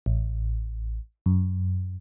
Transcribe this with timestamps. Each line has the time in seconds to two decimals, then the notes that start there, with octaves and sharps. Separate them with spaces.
0.06 A1
1.26 F#2